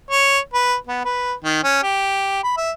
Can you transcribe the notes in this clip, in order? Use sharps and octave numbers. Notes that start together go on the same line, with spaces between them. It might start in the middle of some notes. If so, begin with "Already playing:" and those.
C#5
B4
B3
B4
D#3
C#4
G4
B5
E5